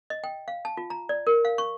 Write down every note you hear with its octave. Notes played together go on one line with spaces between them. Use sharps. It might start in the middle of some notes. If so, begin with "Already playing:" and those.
D#5
G5
F5
A5
F4
A#5
D5
A#4
F5
C#6